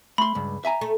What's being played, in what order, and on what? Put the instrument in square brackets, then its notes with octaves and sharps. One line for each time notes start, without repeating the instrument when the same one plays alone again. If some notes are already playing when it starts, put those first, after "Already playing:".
[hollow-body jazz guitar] A3 C6 [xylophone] B5
[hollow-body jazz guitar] C#2 G2
E5 G#5 A#5
[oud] A3